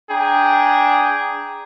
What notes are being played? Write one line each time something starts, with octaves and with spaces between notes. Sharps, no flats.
D4 G#4 G5 A#5